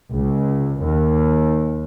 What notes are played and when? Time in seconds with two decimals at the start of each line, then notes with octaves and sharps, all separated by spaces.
0.12 C#2
0.81 D#2